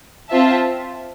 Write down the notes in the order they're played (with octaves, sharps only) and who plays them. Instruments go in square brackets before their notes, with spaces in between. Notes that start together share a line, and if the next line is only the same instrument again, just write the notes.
[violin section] C4 F4 C5 E5 A5